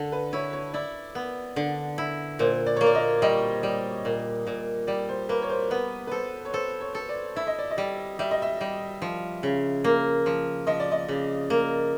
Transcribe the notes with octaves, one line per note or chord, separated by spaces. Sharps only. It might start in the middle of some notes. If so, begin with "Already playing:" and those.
Already playing: D3 A4
B4
E4 C#5
C#5
E4 D5
B3
D3
E4
A#2 C5
D5
C#5
A#3
D5
D#5
G3 D#5
G3
A#2
A#2
G3 D5
C5
A#3 B4
C#5
C5
B3 B4
B4
A4 C5
C#5
A4 C5
C#5
A4
D5
E4 E5
D#5
D5
D#5
G3
G3 E5
D#5
E5
G3
F3
C#3
A#3
F3
F3 D#5
D5
D#5
C#3
A#3